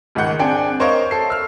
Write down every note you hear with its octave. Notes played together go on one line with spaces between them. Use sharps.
C#2 G#2 D#3 F#5 G6
C4 D4 G#4 G5
A#4 C5 C#5 D#5 F5 C#6
A4 C7
E6 F6